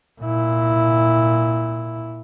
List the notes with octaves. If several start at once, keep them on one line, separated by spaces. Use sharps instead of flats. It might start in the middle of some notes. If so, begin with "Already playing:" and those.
A#2 E4